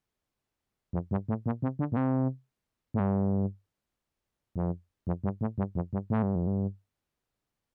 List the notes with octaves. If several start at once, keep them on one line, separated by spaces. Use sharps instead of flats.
F2
G2
A2
A#2
C3
D3
A#2
C3
A2
G2
F2
F2
G2
A2
G2
F2
G2
A2
G2
F2
G2